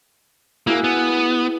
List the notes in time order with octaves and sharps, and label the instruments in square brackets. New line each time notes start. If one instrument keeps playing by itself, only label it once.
[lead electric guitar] A#3 [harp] E4 F#4 G#4
[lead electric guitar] B3